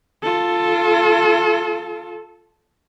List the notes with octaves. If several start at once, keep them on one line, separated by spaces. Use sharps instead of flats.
F4 A4